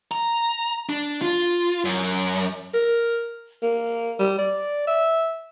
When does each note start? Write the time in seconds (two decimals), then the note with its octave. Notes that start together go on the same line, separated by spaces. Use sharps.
0.12 A#5
0.89 D4
1.22 F4
1.85 F#2
2.74 A#4
3.62 A#3
4.19 G3
4.38 D5
4.87 E5